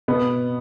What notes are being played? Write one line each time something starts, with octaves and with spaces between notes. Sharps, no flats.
B2 B3